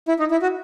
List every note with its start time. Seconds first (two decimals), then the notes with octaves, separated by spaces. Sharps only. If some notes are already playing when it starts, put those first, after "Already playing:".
0.08 E4
0.19 D#4
0.31 E4
0.42 F#4